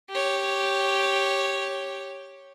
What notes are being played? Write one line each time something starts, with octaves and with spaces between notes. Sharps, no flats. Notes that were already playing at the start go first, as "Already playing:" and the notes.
G4 C#5